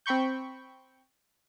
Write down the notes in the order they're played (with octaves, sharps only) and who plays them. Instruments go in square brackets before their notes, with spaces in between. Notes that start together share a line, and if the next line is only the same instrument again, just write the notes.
[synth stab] C4 G5 B5 C#6 G6